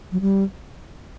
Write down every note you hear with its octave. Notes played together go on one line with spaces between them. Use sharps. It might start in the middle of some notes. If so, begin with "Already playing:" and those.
F#3
G3